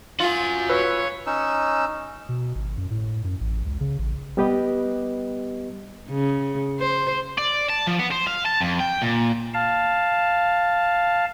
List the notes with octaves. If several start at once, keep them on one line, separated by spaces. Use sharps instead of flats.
F4 F#4 G#5
B4 C#5 E6
C#4 D#4 E6
B2
G#1
F#2
A2
F#2
A1
C#2
C#3
A1
G3 B3 G4 B4 D#5
C#3
C5
D5
A5
F3
B3
C5
F5
A5
F2
G5
A#2
F5 A5